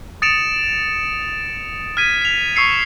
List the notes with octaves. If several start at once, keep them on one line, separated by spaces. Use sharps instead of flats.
D#6 A6 C#7 D7 E7 F7
F6 G#6 B6 D#7
B6 F7
C#6 E6 C7 C#7